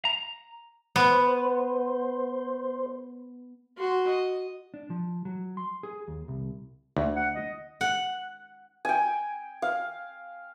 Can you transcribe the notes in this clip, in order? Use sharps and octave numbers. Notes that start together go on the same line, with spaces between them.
A#5
B3 C5
F#4 C6
D#5
D4
F3
F#3
C6
G#4
D#2
C2
D2
F#5
D#5
F#5
G5 G#5
F5